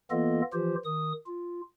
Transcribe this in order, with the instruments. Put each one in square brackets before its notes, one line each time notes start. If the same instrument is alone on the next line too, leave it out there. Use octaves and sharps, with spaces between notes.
[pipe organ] E3 A#3 B3 F4 A4 D#5
E3 F3 F4 G4 C5
D#3 D#6
F4